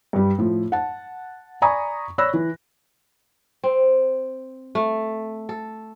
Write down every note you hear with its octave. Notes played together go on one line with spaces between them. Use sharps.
G2 G3
A2 F3
F#5 A5
D5 G#5 A#5 B5 C#6 D#6
C#5 D5 B5 E6 F#6 A#6
E3
C4
A3
A4